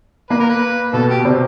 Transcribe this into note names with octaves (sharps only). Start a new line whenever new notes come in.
A#3 B4
A#4
B4
B2 B3 A4
G4
C3 C4